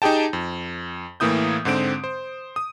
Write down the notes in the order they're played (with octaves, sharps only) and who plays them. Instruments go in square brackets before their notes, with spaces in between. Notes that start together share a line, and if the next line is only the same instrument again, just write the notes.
[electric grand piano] D#4 G4 G#4 G5 A5
F2
A2 E3 A#3 E4 D#6 G6
G#2 D3 C4 D7
C5
D#6